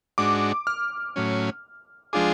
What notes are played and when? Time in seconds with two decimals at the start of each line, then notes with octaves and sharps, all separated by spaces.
0.18 G#2 G#3 D4 F#4 D6
0.67 F6
1.16 A2 F#3 C#4
2.13 F3 G#3 D4 F4 G#4 D6